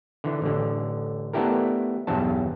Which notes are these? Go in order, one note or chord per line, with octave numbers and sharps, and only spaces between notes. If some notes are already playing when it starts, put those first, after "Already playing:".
D3 E3
A1 D3
A3 B3 D4 E4 G4 A#4
B1 E2 G2 A5